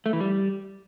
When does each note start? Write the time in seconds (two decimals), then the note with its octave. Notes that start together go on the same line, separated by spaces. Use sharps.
0.06 A3
0.13 E3
0.20 G3